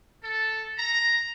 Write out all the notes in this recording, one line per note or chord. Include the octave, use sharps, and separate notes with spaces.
A4
A#5